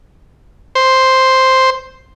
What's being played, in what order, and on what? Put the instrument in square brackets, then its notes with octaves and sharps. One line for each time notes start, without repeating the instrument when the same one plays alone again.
[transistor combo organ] C5